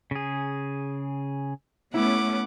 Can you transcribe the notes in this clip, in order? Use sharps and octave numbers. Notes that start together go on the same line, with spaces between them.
C#3 G#4
A3 B3 C#4 E4 F#5 D6